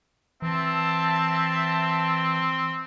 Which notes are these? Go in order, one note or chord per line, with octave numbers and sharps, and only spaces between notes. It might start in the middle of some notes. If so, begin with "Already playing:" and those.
E3 C4 E5 A5